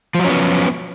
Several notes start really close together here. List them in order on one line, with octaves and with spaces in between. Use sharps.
F3 F#3 C#4 B3